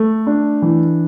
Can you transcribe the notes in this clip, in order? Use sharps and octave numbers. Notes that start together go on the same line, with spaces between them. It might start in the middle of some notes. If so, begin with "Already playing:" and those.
Already playing: A3
D4
E3